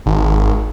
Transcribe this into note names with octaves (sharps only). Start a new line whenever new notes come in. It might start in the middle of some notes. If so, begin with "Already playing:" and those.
G#1